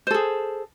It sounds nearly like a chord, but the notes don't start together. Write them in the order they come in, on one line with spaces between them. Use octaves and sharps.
C5 A4 G#4